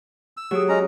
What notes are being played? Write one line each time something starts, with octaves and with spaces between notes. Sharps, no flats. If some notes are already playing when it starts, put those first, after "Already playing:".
E6
F#3 G4 G#4 D#6
G#3 C#4 A#5